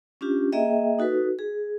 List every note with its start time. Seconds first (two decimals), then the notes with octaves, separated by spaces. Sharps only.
0.21 C#4 D4 F4 G4
0.52 A#3 G#4 D#5 E5 G5
0.99 D#4 F#4 A4 B4
1.39 G#4